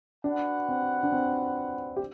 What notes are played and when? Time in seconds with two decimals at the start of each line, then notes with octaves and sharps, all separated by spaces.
0.24 D4 F#4 B4 F#5
0.69 C4
1.03 D4
1.12 C4
1.97 G4